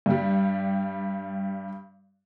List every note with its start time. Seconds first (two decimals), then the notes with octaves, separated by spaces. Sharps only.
0.06 G2 G3